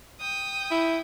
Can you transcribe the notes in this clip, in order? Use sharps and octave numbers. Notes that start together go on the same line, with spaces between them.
G5 D#6
E4